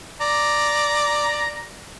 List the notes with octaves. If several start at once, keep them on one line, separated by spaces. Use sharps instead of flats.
D5 A#5